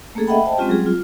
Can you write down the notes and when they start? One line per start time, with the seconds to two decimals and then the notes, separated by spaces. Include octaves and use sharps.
0.15 A3 A#3 C#4 G#4 A4
0.27 D#5 E5 F#5 G5 B5
0.46 C5 D#5 G5 A5
0.58 G#3 C4 C#4 F4 G4
0.69 F#3 G3 C4 G#4
0.86 F4